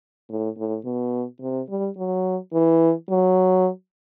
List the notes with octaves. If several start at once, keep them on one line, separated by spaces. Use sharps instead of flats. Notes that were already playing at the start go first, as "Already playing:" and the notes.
A2
A2
B2
C3
G3
F#3
E3
F#3